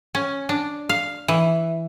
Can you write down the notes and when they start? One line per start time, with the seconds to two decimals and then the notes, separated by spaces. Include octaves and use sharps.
0.15 C#4
0.49 D4
0.89 F5
1.28 E3